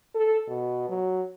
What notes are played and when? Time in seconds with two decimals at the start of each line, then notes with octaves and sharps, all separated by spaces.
0.15 A4
0.48 B2
0.89 F#3